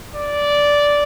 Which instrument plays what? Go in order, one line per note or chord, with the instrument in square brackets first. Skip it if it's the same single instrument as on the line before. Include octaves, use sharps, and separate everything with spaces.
[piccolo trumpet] D5